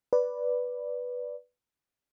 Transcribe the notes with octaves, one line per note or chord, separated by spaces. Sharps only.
B4 D5